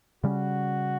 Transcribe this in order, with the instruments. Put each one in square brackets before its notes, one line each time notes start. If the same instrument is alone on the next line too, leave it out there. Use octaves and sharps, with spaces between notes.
[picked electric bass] C#3 G3 C#4 [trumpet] F#4